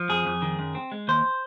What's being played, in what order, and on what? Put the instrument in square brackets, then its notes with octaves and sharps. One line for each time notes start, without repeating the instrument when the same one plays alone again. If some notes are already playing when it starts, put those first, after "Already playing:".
Already playing: [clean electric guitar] F3
F2 G#4
F2
D#3
F#2
C4
G#3
D#2 C5